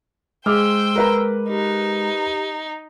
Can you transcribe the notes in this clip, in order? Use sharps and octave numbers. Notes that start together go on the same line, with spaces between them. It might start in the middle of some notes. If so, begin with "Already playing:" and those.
G#3 G#4 C5 G5 D6 E6 F6
A#4 B4 A#5
D#4 G4